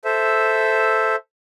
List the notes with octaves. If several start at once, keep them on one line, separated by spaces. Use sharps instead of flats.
A4 C5 E5